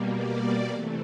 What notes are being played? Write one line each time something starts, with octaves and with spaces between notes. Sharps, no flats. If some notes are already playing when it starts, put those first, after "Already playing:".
Already playing: B2 G3 A#3
D5
C3 E3 A3